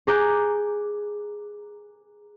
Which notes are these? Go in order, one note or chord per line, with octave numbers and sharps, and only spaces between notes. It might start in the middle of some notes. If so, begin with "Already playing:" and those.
G#4 A#5 D6 F#6 G6